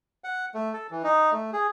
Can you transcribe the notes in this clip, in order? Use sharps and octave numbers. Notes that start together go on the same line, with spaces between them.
F#5
A3
A4
E3
D#4
A3
G#4